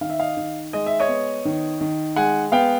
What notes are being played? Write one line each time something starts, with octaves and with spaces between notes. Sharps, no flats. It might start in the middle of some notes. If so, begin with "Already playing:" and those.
D#3 F5
E5
D#5 F5
D#3
G#3 D#5
E5
C#5 D#5
B3
D#3
D#3
G#3 F#5 G#5
B3 F5 G5